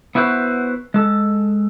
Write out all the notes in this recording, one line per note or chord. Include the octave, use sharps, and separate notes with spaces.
B3 E4 F#4 B4 C5
G#3 A4